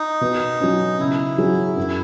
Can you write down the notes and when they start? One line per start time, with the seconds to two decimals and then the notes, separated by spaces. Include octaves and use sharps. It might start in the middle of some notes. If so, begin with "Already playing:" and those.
Already playing: D#4
0.21 B2
0.61 F#3 C#4
0.99 C#3 E4
1.38 F#3 C#4 G#4
1.77 F#2